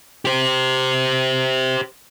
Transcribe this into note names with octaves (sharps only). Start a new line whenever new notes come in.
G4 C5